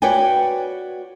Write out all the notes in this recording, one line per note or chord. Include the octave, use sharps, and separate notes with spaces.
F#4 B4 C#5 D5 G5 G#5